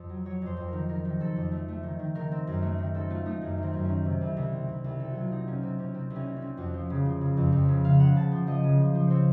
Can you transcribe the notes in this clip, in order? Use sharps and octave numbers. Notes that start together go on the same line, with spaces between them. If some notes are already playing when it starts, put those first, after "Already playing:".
Already playing: F2
F#3
F#3 C#5
F2 C5
F2
A#4
D#3
D#3 A#4
D#3
C4 A4
F2
A3
A3
D#3
D#3
D#3 A#4
C4
F#2
A3
D#3
C4 A4
A3 F4
A3 D#4
F#2
D#3
C4
F#2
D#3 C#4
C3
C2
C2
C4
C2
C2
C4 A4
F#4
F#3
F4
C4 D#4
C3 C#4
C3 C4
C3 C#4
C3 C4
C2
C#4
C4
C#4
C4
F2 F#4
F3
C#3
F3
C#3
F2
F2
C#3
C#3 F5
C#3 F#5
C#3 A5
F3
F3 D#5
C#3
F3
F3
C4 C5 C#5